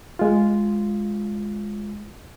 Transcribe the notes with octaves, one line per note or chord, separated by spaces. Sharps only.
G#3 F4